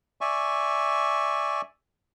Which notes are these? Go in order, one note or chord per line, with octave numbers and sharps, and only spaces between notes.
D5 E5 G#5 C#6